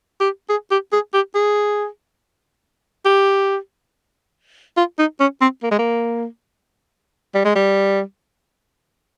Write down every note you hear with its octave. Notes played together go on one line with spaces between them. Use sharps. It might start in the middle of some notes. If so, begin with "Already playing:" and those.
G4
G#4
G4
G#4
G4
G#4
G4
F4
D#4
C#4
C4
A#3
G#3
A#3
G3
G#3
G3